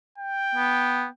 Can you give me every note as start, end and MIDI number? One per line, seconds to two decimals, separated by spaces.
0.18 1.10 79
0.55 1.06 59